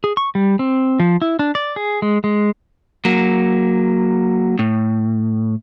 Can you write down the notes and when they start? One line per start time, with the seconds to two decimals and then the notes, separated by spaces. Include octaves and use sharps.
0.04 G#4
0.17 C#6
0.35 G3
0.59 C4
1.00 F3
1.22 E4
1.39 D4
1.55 D5
1.76 G#4
2.02 G#3
2.24 G#3
3.05 F#3 A#3
4.59 A2